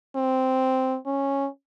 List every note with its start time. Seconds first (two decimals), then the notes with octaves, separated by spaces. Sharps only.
0.16 C4
1.06 C#4